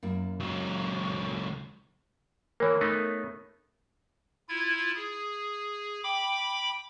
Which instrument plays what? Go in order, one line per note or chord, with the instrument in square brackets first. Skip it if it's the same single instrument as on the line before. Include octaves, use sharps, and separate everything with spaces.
[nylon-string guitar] F#2 A#3 E4
[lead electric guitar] C#2 F#3
[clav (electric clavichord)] E3 A#3 [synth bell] A#4 C#5
[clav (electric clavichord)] A3 B3 D#4
[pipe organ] E4 F4 G#6
G#4
G5 B5 D6